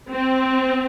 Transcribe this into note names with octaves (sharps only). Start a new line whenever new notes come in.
C4